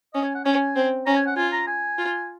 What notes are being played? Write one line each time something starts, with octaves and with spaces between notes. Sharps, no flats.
C#4 D#5
G#5
F#5
C#4 G#5
C4
C#4 A#5
G#5
F#5
F4 G#5
A#5
G#5
F4